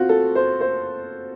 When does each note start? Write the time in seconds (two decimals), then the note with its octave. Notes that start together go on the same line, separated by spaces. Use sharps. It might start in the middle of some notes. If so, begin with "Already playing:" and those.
Already playing: C4 F4 F#4
0.09 A4
0.35 C5
0.61 C5